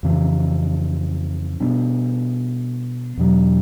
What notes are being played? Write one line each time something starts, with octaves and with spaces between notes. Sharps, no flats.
F2 C#3 E3
B2 G3 B3 D4
E2 B2 F#3